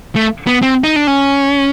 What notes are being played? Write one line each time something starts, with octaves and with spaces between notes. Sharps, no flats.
A3
B3
C4
D#4
D4
C#4